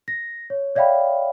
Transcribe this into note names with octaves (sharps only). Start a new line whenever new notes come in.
A#6
C#5
C#5 D5 E5 F5 G5 B5